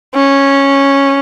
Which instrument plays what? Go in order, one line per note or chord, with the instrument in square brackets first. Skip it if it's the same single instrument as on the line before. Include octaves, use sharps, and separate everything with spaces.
[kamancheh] C#4